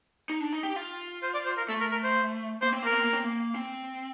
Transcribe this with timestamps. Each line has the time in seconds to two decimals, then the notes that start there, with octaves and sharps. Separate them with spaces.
0.29 D#4
0.41 D4
0.52 D#4
0.63 G4
0.76 F4
1.23 C5
1.34 D5
1.45 C5
1.57 A#4
1.69 A3 A4
1.81 A#4
1.92 A#4
2.04 C5
2.62 A#3 C5
2.72 C4
2.83 A#3 A#4
2.92 C4
3.03 A#3
3.13 C4
3.24 A#3
3.55 C4